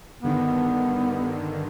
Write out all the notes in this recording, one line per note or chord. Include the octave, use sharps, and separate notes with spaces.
G2 D3 D#3 B3